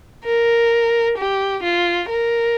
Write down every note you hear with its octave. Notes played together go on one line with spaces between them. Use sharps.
A#4
G4
F4
A#4